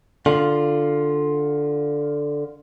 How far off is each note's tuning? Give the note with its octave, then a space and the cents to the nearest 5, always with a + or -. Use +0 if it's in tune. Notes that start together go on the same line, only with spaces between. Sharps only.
D3 +0 F4 +0